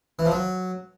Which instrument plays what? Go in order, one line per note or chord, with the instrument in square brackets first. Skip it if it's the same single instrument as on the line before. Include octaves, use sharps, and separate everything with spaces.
[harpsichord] E3
F3
F#3